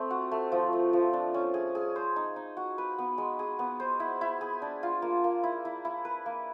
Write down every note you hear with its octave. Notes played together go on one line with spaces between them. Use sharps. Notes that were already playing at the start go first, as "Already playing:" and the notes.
Already playing: A3 C4
F#4
A3
F3
A3
F3
D4
C#4
G#4
G#4
C5
D#4
D#4
F#4
B4
B3
G#3
G#4
B3
C5
E4
E4
G#4
D4
F4
A#3
A#3
E4
E4
E4
B4
A#3